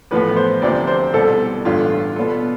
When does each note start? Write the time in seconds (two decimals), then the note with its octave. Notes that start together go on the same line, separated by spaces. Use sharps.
0.11 A1 A2 F3 B3 B4
0.37 C5
0.62 D2 C3 F3 C4 D5
0.87 C5
1.13 C2 B2 G3 A4
1.65 A1 G2 D3 A3 F4
2.16 B2 B3 D4 A4